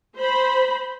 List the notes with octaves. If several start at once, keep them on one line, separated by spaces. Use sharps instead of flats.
C5 B5